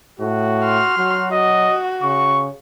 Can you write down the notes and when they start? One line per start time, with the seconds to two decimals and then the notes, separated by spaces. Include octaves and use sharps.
0.20 A2 F#4
0.65 C6 F6
0.98 F#3 F#4
1.31 F#4 D#5
2.03 C#3 C#6